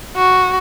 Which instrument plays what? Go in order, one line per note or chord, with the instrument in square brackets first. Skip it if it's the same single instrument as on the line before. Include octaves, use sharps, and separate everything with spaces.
[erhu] F#4